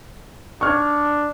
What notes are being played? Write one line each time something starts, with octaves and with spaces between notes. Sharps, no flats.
D4 C#6 F6 G#6